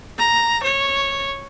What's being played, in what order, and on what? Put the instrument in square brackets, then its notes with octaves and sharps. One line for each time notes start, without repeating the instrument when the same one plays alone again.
[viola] A#5
C#5